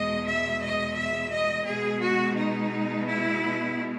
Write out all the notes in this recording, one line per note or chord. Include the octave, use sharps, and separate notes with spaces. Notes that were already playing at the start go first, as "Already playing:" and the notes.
Already playing: E2 B2 G#3 D#5
E5
D#5
E5
D#5
B2 G#3 B3 G#4
F#4
D#4
E4